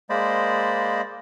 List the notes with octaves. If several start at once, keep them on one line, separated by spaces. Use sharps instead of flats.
G#3 A#3 C5 D5 D#5 B5